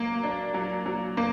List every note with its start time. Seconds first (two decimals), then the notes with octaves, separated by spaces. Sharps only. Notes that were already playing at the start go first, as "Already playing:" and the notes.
Already playing: F#3 A#3
0.23 D4
0.54 F#3
0.86 F#3
1.17 A#3